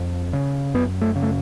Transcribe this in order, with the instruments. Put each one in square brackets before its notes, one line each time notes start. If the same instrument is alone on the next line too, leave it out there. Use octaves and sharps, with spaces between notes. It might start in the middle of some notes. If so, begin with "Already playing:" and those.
Already playing: [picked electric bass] F2
C#3
F#2 B3
A3
C#3
A3